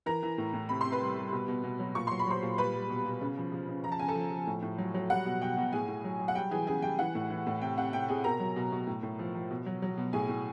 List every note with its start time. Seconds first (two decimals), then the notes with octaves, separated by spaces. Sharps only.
0.06 E3 A#4 A#5
0.23 E3
0.38 A2
0.54 A2
0.69 C3 B5
0.81 C3 C6
0.92 B4 B5
1.01 G3
1.17 G3
1.32 B2
1.48 B2
1.64 B2
1.79 F#3
1.95 A#2 C#6
2.07 F#3 C6
2.19 B5
2.27 F#3 C5 C6
2.43 A#2
2.58 G3 B4 B5
2.73 G3
2.89 B2
3.06 B2
3.21 C#3
3.37 F3
3.52 F3
3.68 C#3
3.84 F3 A#5
3.92 A5
3.99 C#3 G#5
4.08 A4 A5
4.15 F3
4.31 F3
4.47 A2
4.62 A2
4.78 F#3
4.94 F#3
5.10 G3 F#5
5.26 B2
5.41 B2 G5
5.57 B2
5.73 A2 G#4 G#5
5.88 A2
6.04 F#3
6.19 F#3
6.28 F#5
6.35 G3 G5
6.51 E3 G#4 G#5
6.67 C#3 G#4 G#5
6.82 G3 G5
6.99 E3 F#5
7.15 A2
7.30 E3
7.46 A2
7.62 C3 G5
7.78 C3 F#5
7.93 C3 G5
8.08 C3 G#4 G#5
8.24 B2 A#4 A#5
8.40 F#3
8.56 B2
8.72 B2
8.87 A2
9.03 A2
9.19 F3
9.35 F3
9.51 B2
9.66 F#3
9.82 F#3
9.98 B2
10.13 A2 G#4 G#5
10.29 A2